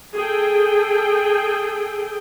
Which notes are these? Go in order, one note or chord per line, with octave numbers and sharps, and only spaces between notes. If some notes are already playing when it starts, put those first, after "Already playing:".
G#4 A4 G5